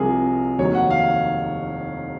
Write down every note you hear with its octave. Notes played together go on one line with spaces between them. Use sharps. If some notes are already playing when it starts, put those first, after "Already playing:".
Already playing: C2 C3 F3 G#4 A#4
F1 D#2 D#3 F#3 C#5
F#5
F5